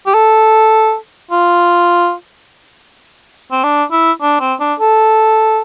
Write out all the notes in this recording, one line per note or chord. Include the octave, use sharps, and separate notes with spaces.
G4
A4
F4
C4
D4
E4
D4
C4
D4
A4